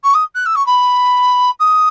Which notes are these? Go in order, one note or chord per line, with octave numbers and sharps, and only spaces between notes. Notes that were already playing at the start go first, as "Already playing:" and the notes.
C#6
D#6
F#6
E6
C#6
B5
D#6